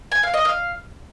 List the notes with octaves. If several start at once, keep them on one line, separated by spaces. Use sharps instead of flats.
G#5
F5
D#5
F5